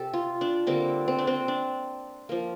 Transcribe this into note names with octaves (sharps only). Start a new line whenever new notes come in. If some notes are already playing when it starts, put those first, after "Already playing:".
Already playing: C3 G4 A4
F4
D4
D3 G3 A#3 C4
C4
D4
C4
D4
F3 A#3